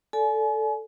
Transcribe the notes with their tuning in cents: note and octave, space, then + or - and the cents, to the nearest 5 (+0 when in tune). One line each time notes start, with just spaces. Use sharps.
A4 +0 D5 -20 G#5 +35